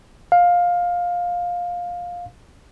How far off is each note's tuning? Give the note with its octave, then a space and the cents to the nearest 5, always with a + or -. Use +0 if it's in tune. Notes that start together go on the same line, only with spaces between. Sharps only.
F5 +15